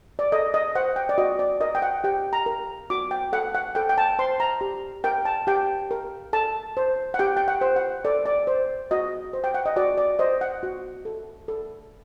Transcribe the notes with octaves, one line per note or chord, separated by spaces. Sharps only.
D5
A4 D#5
D#5
C5 F#5
G5
D5
F#4 D#5
D5
A#4 D#5
G5
F#5
G4 G5
A#5
A#4
F#4 D6
G5
A4 F#5
F#5
A4 G5
G5
A5
C5 C6
A#5
G4
A#4 G5
A5
G4 G5
A#4
A4 A5
C5
F#5
G4 G5
G5
F#5
C5
F#5
A4 D5
D5
C5
F#4 D#5
C5
G5
F#5
D#5
F#4 D5
D5
C5 D#5
F#5
F#4
A4
A4